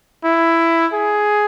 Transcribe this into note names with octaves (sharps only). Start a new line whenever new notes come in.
E4
G#4